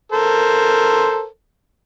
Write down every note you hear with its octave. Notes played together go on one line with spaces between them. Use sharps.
A4 A#4 C5